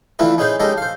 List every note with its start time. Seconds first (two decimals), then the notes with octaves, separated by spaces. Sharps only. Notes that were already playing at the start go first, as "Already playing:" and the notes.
0.19 D3 E3 A3 E4 F4 B4
0.38 C#4 D#4 G#4 B4 C5
0.60 G#3 C#4 D#4 G4 A4 A#4
0.78 C5 F5